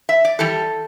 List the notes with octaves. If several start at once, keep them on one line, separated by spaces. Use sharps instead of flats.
E5
D5
E3 G3 A4